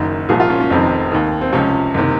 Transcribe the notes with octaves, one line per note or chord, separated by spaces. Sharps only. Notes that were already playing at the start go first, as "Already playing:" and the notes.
Already playing: F#1 F#2 D#3
C2 A#2 F3 G#4
F4
C#4
C#4
F1 F2 C3 D#3 C4
D#2 D#3
C4
C#2 C3 F3 C#4
F#1 C3 D#3